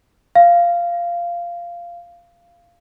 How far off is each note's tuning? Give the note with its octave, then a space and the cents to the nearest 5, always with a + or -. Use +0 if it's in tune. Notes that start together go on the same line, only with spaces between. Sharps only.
F5 -10